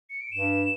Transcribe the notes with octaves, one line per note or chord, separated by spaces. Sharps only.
C#7
D7
G2 E7